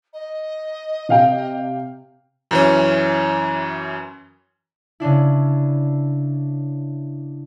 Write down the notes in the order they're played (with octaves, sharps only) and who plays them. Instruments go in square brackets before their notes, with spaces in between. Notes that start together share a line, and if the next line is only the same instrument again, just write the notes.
[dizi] D#5
[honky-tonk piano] C3 F5 G5
[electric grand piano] F#2 E3 C#4
[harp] C#3 C#4 D4 E4